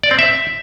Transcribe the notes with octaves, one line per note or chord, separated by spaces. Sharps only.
D5
C4
E5